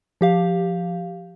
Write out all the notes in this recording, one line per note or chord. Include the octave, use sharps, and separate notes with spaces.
F3 G4 F5